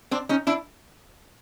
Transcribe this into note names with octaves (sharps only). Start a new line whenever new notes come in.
C4 D4
C#4 D#4
D4 E4